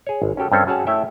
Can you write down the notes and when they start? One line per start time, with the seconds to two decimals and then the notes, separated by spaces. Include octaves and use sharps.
0.07 G#4 C#5
0.22 G#1
0.37 C#4 F#4 G4 A4
0.52 G2 C4 C#4 A4 C5 C#5
0.67 C#4 F#4 G#4 C#5 F#5 A5
0.87 A3 E4 C#5 E5 G5